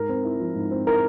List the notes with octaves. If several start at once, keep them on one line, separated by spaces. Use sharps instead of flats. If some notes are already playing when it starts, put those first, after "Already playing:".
Already playing: G#2 A#4
C4
E4
F3
G#2
C4
E4 A#4